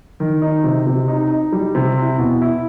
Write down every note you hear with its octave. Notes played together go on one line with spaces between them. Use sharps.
D#3
D#4
C3
C3
D#4
D#4
G3
C3
E4
B2
E4